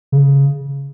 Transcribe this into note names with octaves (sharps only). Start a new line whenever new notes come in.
C#3